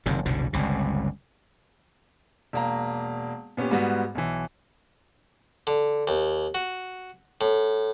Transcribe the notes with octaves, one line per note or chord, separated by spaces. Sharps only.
F#1 C3 D#3
F#1 C2 B2 D3
G1 C#2 C3
E1 A#3 A#5
A#2 B3 C#4 G4
G#2 G3 G#3 B3 F#4
B1 E3
D3
D#2
F#4
A2